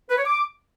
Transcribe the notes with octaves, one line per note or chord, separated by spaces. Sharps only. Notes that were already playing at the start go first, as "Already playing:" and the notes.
B4
C#5
D6